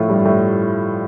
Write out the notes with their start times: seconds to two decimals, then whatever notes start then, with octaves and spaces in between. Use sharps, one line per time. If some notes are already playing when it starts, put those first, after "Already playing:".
Already playing: A2 F3 A3 F4
0.09 G2 G3
0.25 A2 A3